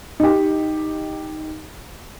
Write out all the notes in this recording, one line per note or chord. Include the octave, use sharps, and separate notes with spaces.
D#4 G4